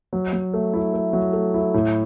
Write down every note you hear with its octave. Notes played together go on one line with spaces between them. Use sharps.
F#3
F#3
A3
E4
A3
F#3
A3
E4
A2